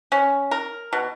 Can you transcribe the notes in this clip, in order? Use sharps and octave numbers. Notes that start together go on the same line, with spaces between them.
C#4
A#4
B2